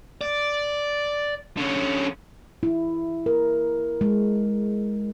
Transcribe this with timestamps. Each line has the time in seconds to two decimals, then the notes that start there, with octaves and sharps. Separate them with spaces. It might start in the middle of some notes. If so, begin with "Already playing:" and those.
0.21 D5
1.57 D3 C#4
2.63 E4
3.26 A#4
4.01 G#3